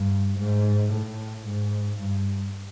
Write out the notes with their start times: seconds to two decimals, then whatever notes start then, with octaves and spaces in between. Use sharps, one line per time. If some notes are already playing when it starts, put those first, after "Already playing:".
Already playing: G2
0.38 G#2
0.92 A2
1.46 G#2
2.00 G2